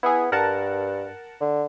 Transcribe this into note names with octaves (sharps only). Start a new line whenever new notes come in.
B3 E4 G#4
G2 A#4 F#5 A5
D3